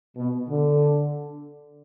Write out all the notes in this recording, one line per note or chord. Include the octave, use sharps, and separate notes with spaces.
B2
D3